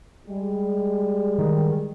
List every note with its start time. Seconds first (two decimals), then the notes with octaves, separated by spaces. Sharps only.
0.28 G3 G#3
1.38 D#3